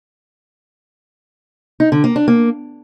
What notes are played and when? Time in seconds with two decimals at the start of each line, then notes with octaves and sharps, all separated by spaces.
1.80 D#4
1.92 D3
2.04 A#3
2.16 D4
2.28 A#3